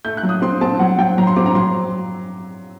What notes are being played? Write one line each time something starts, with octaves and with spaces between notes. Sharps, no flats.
A3 G6
F#6
F#3
D#6
C4 C6
C4 A5
F#3 F#5
F#3 G5
F#3 A#5
C6
C4 D6
A#5
F#3 C6